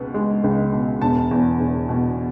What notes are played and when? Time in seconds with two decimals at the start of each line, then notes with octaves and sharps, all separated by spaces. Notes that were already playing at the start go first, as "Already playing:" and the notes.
Already playing: C#2 B2 B3
0.14 G#3
0.44 C#2
0.73 B2
1.01 E1 A5
1.31 E2
1.60 E1
1.89 B2